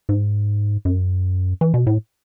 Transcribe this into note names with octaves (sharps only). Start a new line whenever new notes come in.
G#2
F#2
E3
B2
A2